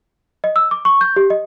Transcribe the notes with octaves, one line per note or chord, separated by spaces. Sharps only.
D#5
E6
D6
C#6
G6
G4
D#5